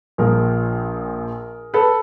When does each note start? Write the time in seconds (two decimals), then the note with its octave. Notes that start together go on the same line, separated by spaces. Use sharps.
0.18 A#1 A#2 F3 G#4 A#4
1.74 A4 B4